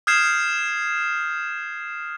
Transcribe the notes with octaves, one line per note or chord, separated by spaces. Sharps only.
D#6 F6 G6 G#6 C7 E7